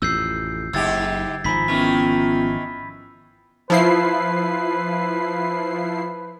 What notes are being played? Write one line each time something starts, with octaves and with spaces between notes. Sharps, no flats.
A1 F2 E6 G6 C7
F#1 G#2 E4 G4 E6 G#6 A6
G#1 F3 D#4 G#5 A#5 B5 B6
D#3 E3 B3 C#4 F4
F3 E4 B4 C7